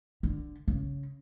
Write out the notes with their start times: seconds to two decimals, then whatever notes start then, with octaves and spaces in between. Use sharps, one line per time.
0.23 D3
0.68 C#3